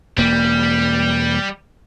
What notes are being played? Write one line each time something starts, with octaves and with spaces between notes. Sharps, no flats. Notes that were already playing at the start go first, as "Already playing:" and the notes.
E1 G3 A#3